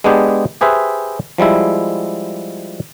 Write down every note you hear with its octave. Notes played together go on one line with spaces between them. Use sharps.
G#3 B3 D4 G4 G#4
G4 G#4 B4 C5 E5
F3 G3 G#3 E4